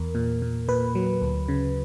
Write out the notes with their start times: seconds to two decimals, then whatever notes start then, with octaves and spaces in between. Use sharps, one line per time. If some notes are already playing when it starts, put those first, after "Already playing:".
Already playing: E2 A#4
0.15 A#2
0.42 A#2
0.68 A#2 B4
0.95 F#3
1.22 D2
1.48 C#3